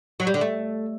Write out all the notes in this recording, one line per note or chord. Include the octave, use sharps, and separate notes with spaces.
F#3
G3
D3
A3